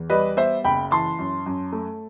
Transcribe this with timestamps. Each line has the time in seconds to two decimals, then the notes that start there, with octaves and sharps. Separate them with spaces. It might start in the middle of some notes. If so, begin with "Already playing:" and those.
Already playing: E2
0.10 G3 B4 D#5
0.37 B3 C5 E5
0.64 F#1 G5 B5
0.91 E3 A5 C6
1.19 F#2
1.46 F#2
1.72 A3